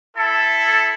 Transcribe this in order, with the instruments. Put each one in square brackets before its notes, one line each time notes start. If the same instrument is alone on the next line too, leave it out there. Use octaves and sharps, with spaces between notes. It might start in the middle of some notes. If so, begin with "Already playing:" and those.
[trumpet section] E4 A4